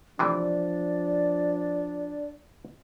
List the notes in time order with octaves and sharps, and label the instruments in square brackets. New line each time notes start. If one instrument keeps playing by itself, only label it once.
[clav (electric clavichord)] C3 E3 A3 [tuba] F3 [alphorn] D4 [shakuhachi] D5